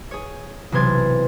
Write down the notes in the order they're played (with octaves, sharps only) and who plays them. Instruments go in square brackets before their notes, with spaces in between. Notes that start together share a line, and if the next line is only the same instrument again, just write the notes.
[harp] G#4 C#5
B1 C3 E3 C6 G#6 A6